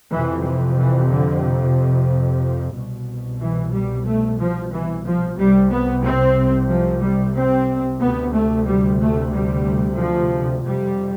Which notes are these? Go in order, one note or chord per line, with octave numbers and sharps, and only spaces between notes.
F2 C3 E3
E3
E3
D3
C2 B2
E3
G3
A3
F3
E3
F3
C2 C3 G3
B3
C4
F3
G3
C4
D2 C3 B3
A3
G3
A3
G3
F3
F2 C3 G3